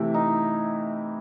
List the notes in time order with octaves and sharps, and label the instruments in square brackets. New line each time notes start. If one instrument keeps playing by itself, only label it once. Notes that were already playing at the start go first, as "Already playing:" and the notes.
Already playing: [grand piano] C3 E3 A3 E4 G4
[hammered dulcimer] D#4